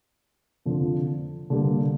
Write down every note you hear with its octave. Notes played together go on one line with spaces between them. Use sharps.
F2 D3 F3
D3 G3 A#3